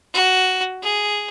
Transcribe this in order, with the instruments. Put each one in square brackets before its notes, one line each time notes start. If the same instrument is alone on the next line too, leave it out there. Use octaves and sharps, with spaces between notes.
[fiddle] F#4
G#4